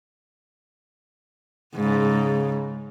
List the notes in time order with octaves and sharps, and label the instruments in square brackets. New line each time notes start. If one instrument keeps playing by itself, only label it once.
[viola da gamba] G#2 [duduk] C#3